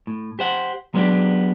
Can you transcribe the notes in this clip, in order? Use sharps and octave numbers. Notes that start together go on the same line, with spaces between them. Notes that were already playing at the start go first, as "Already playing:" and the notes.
A2
G4 C5 F#5
F#3 G#3 B3 C#4 D4 G4